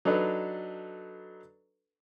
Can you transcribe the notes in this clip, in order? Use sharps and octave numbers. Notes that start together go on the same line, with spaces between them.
F#3 D4 D#4 A4 B4